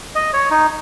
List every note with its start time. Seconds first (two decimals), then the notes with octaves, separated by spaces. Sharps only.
0.15 D#5
0.33 C#5
0.51 D#4